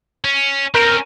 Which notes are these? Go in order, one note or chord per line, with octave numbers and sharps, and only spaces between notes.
C#4
C4 C#4 A#4